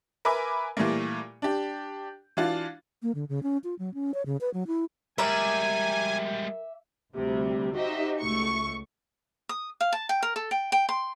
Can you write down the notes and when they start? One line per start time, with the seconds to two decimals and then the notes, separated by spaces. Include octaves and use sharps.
0.25 A#4 B4 E5 G#5 B5 D6
0.77 A#2 E3 G3 A3 A#3
1.42 D4 G4
2.37 E3 D4 F4 F#4
3.03 A#3
3.15 D3
3.29 C#3
3.43 C#4
3.64 F4
3.79 F#3
3.94 C#4
4.14 C#5
4.26 C#3
4.41 B4
4.54 F#3
4.67 E4
5.18 G3 G#3 A#4 D5 E5 G#5
7.14 D2 C3 G3
7.74 D#4 F#4 G4 C5 D#5 E5
8.19 C#2 A3 C#6 C#7
9.49 D#6
9.81 F5
9.93 A5
10.09 G5
10.23 A#4
10.36 A4
10.51 G5
10.72 G5
10.89 C6